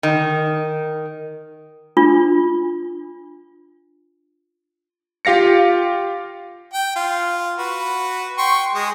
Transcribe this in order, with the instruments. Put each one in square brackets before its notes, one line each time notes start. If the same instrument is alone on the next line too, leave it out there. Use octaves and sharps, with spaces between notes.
[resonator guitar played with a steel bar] D#3
[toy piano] D4 F4
[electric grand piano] F4 G4 F5 A#6 C#7
[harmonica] G5
F4
F#4 B4
G5 C6 C#6
G#3 D#6